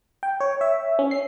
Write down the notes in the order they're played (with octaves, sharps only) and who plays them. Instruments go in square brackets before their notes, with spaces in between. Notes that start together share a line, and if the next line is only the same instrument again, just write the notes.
[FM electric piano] G5
C#5
E5
C#4
C7